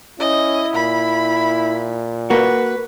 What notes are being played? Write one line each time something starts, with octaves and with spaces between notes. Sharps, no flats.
C#4 E4 D#5
A#2 B5
A#3 F#4 B4